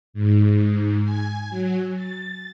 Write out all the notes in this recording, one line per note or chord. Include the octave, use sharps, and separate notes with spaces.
G#2
G#5
F#3
A6